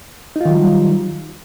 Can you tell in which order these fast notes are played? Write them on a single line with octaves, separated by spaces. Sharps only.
D#4 F4 D#3 F#3 G3